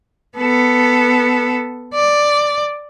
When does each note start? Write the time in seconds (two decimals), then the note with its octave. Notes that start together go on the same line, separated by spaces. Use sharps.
0.38 B3 A4
1.95 D5